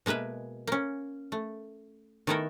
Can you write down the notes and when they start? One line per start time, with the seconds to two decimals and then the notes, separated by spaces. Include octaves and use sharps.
0.06 B2 G#3 A#3 B4 E5
0.67 A#3 C#4
1.32 A3
2.27 D#3 A3 B3 E4 A4 A#4